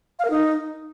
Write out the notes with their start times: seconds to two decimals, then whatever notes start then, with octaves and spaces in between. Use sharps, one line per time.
0.19 F5
0.25 A#4
0.30 D#4